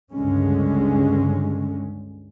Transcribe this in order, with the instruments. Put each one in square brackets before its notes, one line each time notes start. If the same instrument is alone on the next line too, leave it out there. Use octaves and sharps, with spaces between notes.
[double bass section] C#2 G2 D3 G#3 C#4